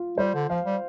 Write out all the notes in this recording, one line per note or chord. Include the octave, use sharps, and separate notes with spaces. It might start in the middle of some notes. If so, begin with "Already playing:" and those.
Already playing: F4
G3 C5
D3
F3 F5
G3